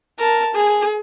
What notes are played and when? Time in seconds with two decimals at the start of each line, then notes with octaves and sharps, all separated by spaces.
0.18 A#4 A5
0.54 G#4